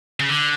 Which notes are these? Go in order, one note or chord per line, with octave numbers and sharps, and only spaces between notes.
C#3
D3